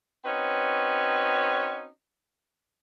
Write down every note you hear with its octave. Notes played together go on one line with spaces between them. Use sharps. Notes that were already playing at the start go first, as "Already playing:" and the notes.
C4 C#4 D#4 F#4 B4 C#5